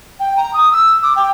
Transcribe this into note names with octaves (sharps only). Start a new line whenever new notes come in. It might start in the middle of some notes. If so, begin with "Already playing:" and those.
G5
A#5
D#6
E6
D6
G5